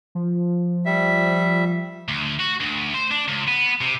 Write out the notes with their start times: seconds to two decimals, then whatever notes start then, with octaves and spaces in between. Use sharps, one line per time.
0.15 F3
0.86 G3 E5
2.09 D2
2.39 F#4
2.60 D2
2.94 C5
3.11 D4
3.28 C#2
3.47 B3
3.81 C3